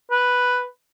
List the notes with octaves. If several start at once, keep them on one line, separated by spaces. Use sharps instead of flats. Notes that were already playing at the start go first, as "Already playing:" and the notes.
B4